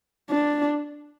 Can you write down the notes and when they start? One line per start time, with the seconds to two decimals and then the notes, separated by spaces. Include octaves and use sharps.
0.31 D4